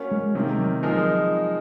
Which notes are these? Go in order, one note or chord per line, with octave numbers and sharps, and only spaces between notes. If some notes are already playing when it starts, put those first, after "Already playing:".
Already playing: A#3 C#4 F#4 C#5
G#3
C3 D#3 G#3 A#3
F#3
F3 G#3 D#4 A#4